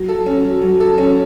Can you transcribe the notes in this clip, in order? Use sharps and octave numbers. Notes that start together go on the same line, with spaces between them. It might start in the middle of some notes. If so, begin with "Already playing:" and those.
Already playing: F#3
A4
C#4
F#3
F#3
A4
C#4